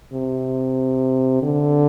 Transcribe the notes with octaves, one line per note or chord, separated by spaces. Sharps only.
C3
D3